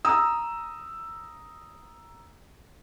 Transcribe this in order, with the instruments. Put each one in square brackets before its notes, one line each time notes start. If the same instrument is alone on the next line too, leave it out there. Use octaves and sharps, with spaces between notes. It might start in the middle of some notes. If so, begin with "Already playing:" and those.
[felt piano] A#5 D#6 E6